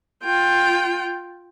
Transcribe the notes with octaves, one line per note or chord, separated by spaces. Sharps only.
F4 G5